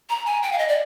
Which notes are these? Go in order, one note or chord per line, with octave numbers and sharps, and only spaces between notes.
A#5
G#5
G5
F5
D#5
D5